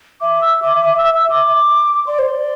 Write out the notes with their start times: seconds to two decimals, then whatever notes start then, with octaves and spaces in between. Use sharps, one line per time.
0.21 E5 D6
0.41 E6
0.62 D6
0.82 D6
0.98 E6
1.14 E6
1.30 D6
2.07 D5 C6
2.18 C5
2.30 D5